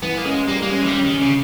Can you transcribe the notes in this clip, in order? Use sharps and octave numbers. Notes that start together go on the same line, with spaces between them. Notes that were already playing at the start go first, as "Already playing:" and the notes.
E3 B3
A#3
G#3 C#4
G3 A#3
A#3
G#3 C#4
E3
G3
C#4
D#3
C#4
C#3